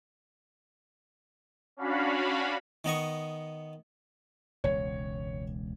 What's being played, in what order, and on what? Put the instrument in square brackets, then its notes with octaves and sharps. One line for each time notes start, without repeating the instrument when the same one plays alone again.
[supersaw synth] C#4 D4 F#4 F5 B5
[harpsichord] D#3 B3 D#5 C#6
[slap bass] E1 C#2 [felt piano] C#5